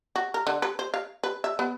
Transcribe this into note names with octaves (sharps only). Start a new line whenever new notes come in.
F#4
A#4
D3
B4
C5
F5
B4
E5
B3